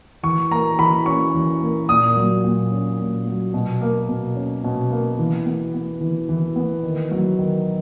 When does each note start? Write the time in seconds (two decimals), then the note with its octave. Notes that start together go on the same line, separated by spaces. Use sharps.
0.23 E3 C#6
0.51 A#3 A#5
0.79 E3 B5
1.06 C#4 C#6
1.34 E3
1.62 A#3
1.89 A#2 D#6
2.17 F#3
2.44 A#2
2.71 C#4
2.99 A#2
3.26 F#3
3.54 B2
3.81 A#3
4.09 B2
4.36 C#4
4.64 B2
4.91 A#3
5.19 E3
5.46 B3
5.74 B3
6.01 E3
6.29 E3
6.56 B3
6.84 D#3
7.11 F#3
7.39 D#3